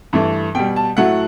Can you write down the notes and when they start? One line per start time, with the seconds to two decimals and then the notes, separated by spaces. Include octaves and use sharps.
0.13 G2 E3 A3
0.55 B2 G3 G5
0.76 A5
0.97 A2 F#3 A3 F#5